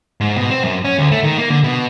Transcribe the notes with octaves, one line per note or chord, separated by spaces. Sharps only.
G#2
B2
C4
F#2
C#4
D2
A3
D#3
A#3
D3
B2